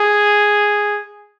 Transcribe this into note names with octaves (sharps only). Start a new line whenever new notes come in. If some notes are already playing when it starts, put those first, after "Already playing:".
Already playing: G#4